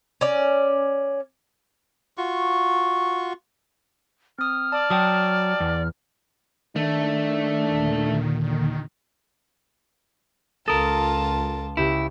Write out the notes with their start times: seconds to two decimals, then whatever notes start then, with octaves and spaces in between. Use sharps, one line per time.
0.21 C#4 D5
2.18 F4 F#4 C#6
4.38 C4 D#6 F6
4.72 D5 A5
4.90 F#3 G5 A5 D#6
5.60 E2
6.76 D#3 A3 D4
7.67 D#2 A#2 D3
10.68 C#2 F4 A4 A#4 A5 D#6 D7
11.77 C#2 E4 G4